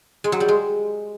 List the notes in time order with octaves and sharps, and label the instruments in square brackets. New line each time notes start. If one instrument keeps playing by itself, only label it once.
[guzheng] G#3
F#3
G3
G#3